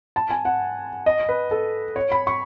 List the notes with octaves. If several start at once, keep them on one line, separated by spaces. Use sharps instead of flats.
A5
G#5
F#5
D#5
B4
A4
C#5
B5
C#6